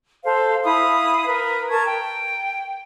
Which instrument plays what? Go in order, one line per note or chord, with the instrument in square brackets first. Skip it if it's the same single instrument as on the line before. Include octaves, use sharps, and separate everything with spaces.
[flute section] A4 C5 F5
E4 F5 B5 D#6
A#4 B4
A#4 A5 C#6 G#6
G5